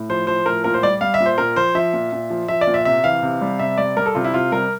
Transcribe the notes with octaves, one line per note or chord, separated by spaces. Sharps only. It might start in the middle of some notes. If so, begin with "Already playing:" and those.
Already playing: A2
F3 C5
F3 C5
A2 A#4
A#2 A#4
C5
G3 D5
G3 F5
E5
A#2
C5
A#2 A#4
F3 C5
F3 E5
A#2
A#2
F3
F3 E5
D5
A#2
E5
C3 E5
E3 F5
C3
G3
C3 E5
G3 D5
G3 A#4
A4
C3 F4
E4
C3 F4
G3 A#4